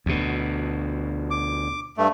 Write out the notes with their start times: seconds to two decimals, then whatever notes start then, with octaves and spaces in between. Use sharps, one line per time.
0.06 D2 B2
1.31 D6
1.97 G2 A3